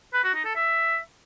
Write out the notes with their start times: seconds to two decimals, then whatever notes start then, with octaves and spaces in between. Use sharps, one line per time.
0.14 B4
0.24 F#4
0.34 D#4
0.45 A4
0.55 E5